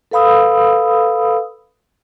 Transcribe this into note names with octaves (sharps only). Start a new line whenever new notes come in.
A4 B4 F5 B5 D#6 E6